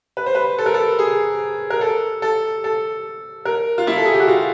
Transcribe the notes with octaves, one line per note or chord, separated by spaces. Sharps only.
B4
C5
B4
A4
A#4
A4
G#4
A#4
A4
A4
A4
A#4
F4
E4
A4
G#4
G4
F#4
F4